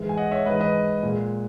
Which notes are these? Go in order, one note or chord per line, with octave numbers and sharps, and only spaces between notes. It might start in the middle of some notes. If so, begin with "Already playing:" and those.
Already playing: G#2 E3 G#3
G#5
D#5 F#5
C#5 E5
G#2 E3 G#3 B4 D#5
B4 D#5
A#2 G#3